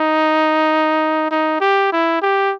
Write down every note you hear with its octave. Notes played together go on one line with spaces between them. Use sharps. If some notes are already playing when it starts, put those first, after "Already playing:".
Already playing: D#4
D#4
G4
E4
G4